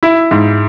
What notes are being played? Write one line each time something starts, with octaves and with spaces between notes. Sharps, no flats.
E4
G#2